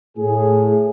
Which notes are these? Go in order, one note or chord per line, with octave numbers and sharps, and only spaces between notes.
A2 G#4